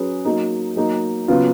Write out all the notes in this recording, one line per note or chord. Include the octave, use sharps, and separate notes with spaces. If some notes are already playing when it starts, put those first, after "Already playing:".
Already playing: F#3 C#4 G#4 B4
F#3 A#3 D#4
F#3 A#3 D#4
C#3 F#3 B3 F4